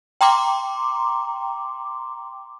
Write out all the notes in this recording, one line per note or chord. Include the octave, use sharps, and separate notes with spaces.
G5 A#5 C6 D6